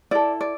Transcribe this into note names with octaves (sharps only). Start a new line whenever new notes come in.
E4 A4 D5
D5